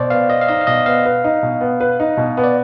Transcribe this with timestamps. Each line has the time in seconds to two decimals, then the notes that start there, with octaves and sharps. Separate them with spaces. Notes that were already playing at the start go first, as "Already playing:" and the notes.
Already playing: B2 C5 D5
0.10 B3 F5
0.29 B4 D#5
0.41 F5
0.48 D#4 D#5
0.61 F5
0.67 B2 D#5
0.86 B3 F5
1.05 B4
1.24 D#4
1.43 B2
1.61 B3
1.80 B4
2.00 D#4
2.17 B2
2.37 B3
2.44 D5